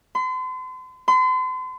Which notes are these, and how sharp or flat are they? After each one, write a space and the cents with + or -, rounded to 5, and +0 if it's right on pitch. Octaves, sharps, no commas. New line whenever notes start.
C6 -40
C6 -40